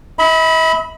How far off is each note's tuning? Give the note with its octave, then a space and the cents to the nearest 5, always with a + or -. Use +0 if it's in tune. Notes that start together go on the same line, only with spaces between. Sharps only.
E5 -45 B5 +0